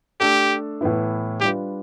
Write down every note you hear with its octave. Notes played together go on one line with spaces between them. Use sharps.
A3 D4 G4 A4
A2 E3 B3 E4
G3 D4 F4 G4 B4